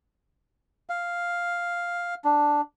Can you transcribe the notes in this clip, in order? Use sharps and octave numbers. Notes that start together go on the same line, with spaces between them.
F5
D4